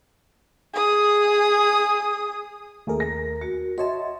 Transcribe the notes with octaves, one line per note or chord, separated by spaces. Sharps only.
G#4 D#6
D#2 A3 G#4 A#4
A#6
F#4 C#7
F#4 C#5 D#5 E5 A5 C6